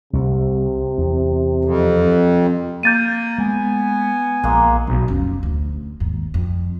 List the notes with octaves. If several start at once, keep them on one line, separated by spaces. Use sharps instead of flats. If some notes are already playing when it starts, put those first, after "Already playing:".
C2 C3
E2
F2
A#3 G6 A6 D#7
G#3 B3 G#5
A#1 G#3 A#3
B1
F1 C#4
D2
D#2 G#2
F2